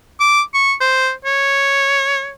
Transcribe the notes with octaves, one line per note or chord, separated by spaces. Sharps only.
D6
C#6
C5
C#5